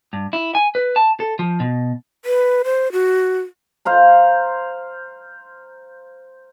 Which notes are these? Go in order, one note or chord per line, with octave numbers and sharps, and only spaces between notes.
G2
E4
G#5
B4
A5
A4
F3
B2
B4
C5
F#4
C5 F5 A#5